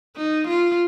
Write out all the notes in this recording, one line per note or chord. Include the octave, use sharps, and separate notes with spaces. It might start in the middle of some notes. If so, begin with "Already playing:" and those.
D#4
F4